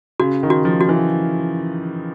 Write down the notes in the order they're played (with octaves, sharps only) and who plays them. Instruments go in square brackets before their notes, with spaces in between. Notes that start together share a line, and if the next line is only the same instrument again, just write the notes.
[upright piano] C#3 [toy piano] F#4
[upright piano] D#3
[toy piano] F#4
[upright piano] F3
[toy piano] F#4
[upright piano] E3